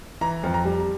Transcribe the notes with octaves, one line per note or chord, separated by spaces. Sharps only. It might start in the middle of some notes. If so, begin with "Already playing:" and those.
E3 A#5
F2
A#5
G3